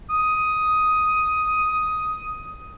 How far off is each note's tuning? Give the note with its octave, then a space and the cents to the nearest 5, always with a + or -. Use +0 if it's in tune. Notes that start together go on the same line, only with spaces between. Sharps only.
D#6 +10